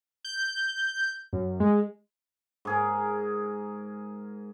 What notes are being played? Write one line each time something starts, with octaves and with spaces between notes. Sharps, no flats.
G6
F#2
G#3
G#2 G#4 A#4